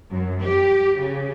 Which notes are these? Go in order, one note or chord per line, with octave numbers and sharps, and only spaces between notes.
F#2
G4
C#3